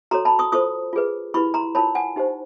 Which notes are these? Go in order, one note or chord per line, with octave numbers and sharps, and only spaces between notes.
F#4 A4 C#5 A#5 C6
A5 B5
C#6 D#6
F4 A4 C5 C#6 D#6
F4 G#4 B4
E4 G4 B4 B5 C#6
A#5 C6
F4 A#4 C#5 A5 B5
F#5 G#5
D#4 G4 C5